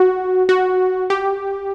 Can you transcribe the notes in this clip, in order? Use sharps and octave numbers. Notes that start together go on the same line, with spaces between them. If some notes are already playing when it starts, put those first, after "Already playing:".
Already playing: F#4
F#4
G4